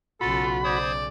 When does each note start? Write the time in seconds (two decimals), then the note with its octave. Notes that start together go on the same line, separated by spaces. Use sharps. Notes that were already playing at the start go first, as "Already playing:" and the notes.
0.21 B1 C#3 F4 F#4 A4 B5
0.64 C5 D5 D#6 G#6